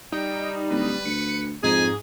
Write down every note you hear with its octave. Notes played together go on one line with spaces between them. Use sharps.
G3 D#4 G5
D1 B4
D2 C#7
F2 G#2 D#4 G#4 G#5